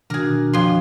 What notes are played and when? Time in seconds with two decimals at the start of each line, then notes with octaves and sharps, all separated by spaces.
0.10 B2 D#3 D4 F#4 G#4 A#4
0.53 F2 C6